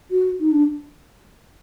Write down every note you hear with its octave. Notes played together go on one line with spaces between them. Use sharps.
F#4
D#4
D4